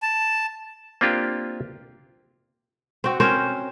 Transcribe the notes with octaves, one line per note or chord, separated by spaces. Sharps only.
A5
A#3 C4 D4 F4 G4
C4 F#4
C4 C#4 A#4 C5